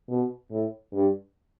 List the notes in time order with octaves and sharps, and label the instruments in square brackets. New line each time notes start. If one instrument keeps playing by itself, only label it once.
[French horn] B2
A2
G2